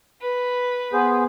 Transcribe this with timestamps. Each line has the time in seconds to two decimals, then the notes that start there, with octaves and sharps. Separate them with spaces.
0.21 B4
0.93 B3 G#4 C5